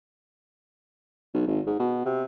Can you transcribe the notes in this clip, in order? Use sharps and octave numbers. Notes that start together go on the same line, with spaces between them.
B1
G#1
G#2
B2
C3